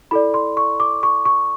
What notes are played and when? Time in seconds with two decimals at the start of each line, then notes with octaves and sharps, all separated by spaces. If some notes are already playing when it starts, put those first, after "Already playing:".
0.11 E4 A4 D5 B5
0.34 C6
0.57 C#6
0.80 D6
1.03 C#6
1.25 C#6